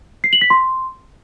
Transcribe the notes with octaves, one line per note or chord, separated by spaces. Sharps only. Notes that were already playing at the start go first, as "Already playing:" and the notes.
C7
F#7
B6
C6